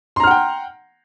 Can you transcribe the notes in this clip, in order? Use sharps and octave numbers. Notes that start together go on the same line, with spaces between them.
F#5 G5 A#5 C6 F6